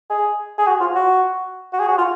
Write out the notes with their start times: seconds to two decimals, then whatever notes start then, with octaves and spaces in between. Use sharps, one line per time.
0.10 G#4
0.58 G#4
0.67 F#4
0.80 F4
0.95 F#4
1.73 F#4
1.80 G#4
1.89 F#4
1.98 F4